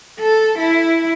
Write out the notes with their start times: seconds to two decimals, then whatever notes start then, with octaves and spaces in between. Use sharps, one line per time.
0.19 A4
0.58 E4